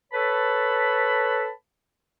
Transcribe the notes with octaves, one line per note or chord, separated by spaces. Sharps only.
A4 B4 C#5 A5 B5